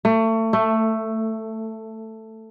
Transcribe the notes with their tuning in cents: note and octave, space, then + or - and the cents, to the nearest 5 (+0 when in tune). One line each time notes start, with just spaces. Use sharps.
A3 +30
A3 +10